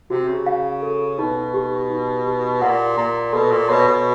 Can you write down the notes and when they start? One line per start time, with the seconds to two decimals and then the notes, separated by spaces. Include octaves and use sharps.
0.10 C3 F#4
0.28 C#3
0.46 F5
0.82 A4
1.19 B2 D#4
1.54 G4
1.90 D#4
2.26 G4
2.62 A#2 F#5
2.98 A#2 A#5
3.33 B2 A4
3.51 A#2
3.69 B2 C#5
3.88 B2